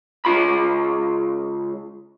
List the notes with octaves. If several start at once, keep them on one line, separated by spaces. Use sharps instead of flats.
C#2 F4 B5